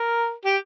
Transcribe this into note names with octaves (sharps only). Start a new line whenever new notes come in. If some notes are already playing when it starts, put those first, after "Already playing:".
Already playing: A#4
G4